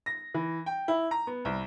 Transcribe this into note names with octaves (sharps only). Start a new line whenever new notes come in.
A#6
E3
G5
E4
A#5
B3
C2